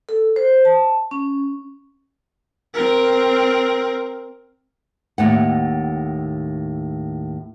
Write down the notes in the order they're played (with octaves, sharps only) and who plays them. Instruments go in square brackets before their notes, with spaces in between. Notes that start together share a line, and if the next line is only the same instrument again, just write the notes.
[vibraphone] A4
C5
A5
C#4
[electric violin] C4 A#4
[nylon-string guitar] D#2 A2 F#5